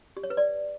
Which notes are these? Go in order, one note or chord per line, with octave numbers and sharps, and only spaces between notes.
G4
C#5
B4
D5